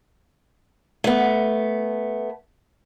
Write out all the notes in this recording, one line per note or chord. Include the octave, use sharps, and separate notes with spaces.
A3 B3